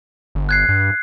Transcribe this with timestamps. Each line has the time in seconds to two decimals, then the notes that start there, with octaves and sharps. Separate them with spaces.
0.35 G1
0.49 F#6 G#6 C7
0.69 G2